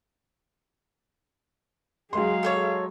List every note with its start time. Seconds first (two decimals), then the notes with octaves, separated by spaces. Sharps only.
2.13 F#3 G#3 G#4 F5 C6
2.43 A4 C5 C#5